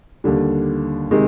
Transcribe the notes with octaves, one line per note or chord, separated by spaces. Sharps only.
D#2 D3 G3
C3 D#3 G#3